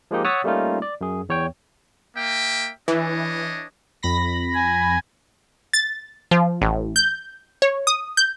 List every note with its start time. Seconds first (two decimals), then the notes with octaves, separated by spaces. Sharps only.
0.11 F3 G#3 A#3 D#4 G4
0.25 C#5 F#5 D#6 E6 A6 B6
0.44 G3 A3 A#3 C#4 D#4 F4
0.82 D5
1.01 F#2 G#4
1.29 E2 C#5 G5
2.16 A#3 E5 G5
2.88 E3 D4 C#5 D#5
4.03 F2 B5 A#6
4.55 G#5
5.73 A6
6.31 F3
6.62 A1
6.96 G6
7.62 C#5
7.87 D#6
8.17 G6